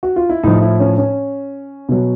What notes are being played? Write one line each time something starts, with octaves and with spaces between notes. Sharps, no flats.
F#4
F4
E4
A2 F3 D#4
E4
C#4
C#4
B2 F#3